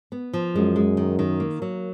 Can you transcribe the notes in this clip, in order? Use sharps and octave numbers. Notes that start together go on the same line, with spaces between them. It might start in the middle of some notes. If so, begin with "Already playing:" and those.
B3
F3
F#2 G#3
G#3
D#3
D#3
A#3
F#3